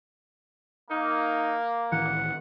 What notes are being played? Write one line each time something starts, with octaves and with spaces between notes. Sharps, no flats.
A#3 D#4
A1 D#3 E3 F#5